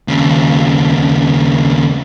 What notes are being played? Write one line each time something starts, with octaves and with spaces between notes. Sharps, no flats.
D#2 C#3